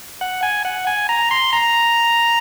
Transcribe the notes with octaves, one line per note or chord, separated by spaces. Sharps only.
F#5
G#5
F#5
G#5
A#5
C6
A#5